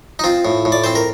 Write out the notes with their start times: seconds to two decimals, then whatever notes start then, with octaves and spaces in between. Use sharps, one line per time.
0.19 D#4
0.24 C4 F4
0.45 A2
0.65 A2
0.72 D5
0.84 C4 C5
0.95 A#4